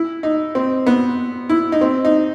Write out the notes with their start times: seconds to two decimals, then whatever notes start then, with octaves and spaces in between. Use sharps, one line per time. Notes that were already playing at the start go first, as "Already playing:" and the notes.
Already playing: E4
0.23 D#4
0.55 C4
0.86 B3
1.49 E4
1.72 D#4
1.81 C4
2.05 D#4